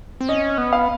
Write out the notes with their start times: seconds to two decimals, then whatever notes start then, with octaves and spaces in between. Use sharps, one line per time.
0.21 C4
0.29 C#4 D#5
0.58 B3
0.73 F5